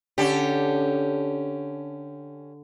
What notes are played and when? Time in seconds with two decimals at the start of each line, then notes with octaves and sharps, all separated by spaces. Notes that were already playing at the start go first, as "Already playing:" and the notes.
0.18 D3 C#4 G4 A4